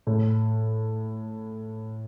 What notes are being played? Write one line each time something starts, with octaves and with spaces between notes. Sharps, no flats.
A2